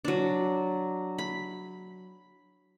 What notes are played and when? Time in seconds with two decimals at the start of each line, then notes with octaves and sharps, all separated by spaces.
0.05 F#3 D4
1.18 B5